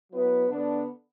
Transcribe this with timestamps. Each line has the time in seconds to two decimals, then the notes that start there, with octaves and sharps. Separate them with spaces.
0.11 F#3 B3 E4 B4
0.48 D3 B3 D4 A4 D5